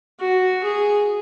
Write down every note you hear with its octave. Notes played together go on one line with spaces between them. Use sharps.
F#4
G#4